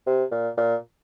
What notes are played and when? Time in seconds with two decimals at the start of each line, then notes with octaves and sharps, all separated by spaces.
0.07 C3
0.31 A#2
0.57 A#2